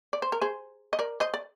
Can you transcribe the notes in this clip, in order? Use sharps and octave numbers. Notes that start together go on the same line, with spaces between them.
D5
C5
A#4
G#4 C5
D#5
A#4 D5
C5 D#5
D5